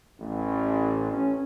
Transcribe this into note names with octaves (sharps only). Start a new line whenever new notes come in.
A1
C#4